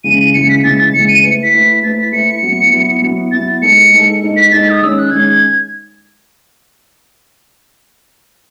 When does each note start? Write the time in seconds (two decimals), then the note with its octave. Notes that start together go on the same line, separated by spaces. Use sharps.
0.04 C#3 E3 G#3 D#7
0.19 D#7
0.34 C#3 E3 G#3 C#7
0.49 B6
0.64 C#3 E3 G#3 A6
0.79 A6
0.93 C#3 E3 G#3 C#7
1.09 D#7
1.23 A3 E4 B4 C#7
1.43 B6
1.53 A3 E4 B4
1.83 A3 E4 B4 A6
1.98 B6
2.12 A3 E4 B4 C#7
2.43 F#3 B3 E4
2.72 F#3 B3 E4
3.02 F#3 B3 E4
3.32 F#3 B3 E4 A6
3.62 G#3 D#4 A4 C#7
3.92 G#3 D#4 A4
4.22 G#3 D#4 A4
4.36 B6
4.51 G#3 D#4 A4 A6
4.70 D#6
4.81 D#3 G#3 C#4 E6
4.97 F#6
5.11 D#3 G#3 C#4 G#6